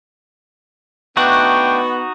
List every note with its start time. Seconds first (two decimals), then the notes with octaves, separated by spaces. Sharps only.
1.17 A3 B3 D4 D#4 F#4 F#5 G5